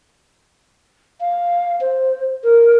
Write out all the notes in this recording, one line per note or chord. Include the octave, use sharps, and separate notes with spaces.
F5
C5
A#4